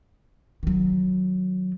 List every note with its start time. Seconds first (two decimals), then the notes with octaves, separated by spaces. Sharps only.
0.63 D#3 F#3